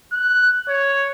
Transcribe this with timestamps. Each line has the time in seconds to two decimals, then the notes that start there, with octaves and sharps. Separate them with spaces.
0.12 F#6
0.69 C#5